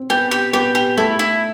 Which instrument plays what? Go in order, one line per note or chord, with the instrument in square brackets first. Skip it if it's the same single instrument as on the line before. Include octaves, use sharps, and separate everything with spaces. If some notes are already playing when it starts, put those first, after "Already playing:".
Already playing: [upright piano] C4 C5
[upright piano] B3 B4 [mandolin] G4
[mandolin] G4
[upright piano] B3 B4 [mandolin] G4
[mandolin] G4
[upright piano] A3 A4 [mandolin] E4
[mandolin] E4